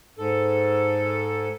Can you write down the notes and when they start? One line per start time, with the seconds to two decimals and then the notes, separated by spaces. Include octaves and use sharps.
0.18 G#2 A4